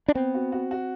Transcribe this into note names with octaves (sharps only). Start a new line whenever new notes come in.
D4
B3 C4
F#4
F#4
F#4